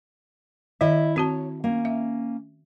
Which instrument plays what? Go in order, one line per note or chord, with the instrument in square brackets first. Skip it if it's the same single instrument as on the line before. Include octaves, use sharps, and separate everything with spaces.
[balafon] D#3 [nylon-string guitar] E4 D#5 E5
[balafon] C4 F#4 A5 [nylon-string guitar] C#5
[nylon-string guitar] A#3 C#4
[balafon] E5